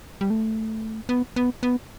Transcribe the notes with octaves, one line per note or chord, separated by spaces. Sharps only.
G3
A3
B3
B3
B3